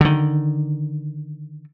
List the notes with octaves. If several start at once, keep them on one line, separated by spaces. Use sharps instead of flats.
D3 D#3